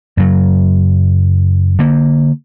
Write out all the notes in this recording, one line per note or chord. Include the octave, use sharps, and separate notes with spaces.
F#2 C#3 F#3
D3 A#3